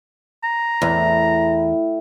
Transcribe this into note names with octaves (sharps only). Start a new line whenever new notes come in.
A#5
E2 A2